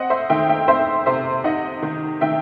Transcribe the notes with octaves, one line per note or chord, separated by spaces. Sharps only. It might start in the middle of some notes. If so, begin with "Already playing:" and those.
Already playing: C4 D#5 F#5
C5 E5
D#3 E5 G5
E5 G5
C4 C5 E5
C3 C5 E5
D#4 D#5 F#5
D#3
D#3 E5 G5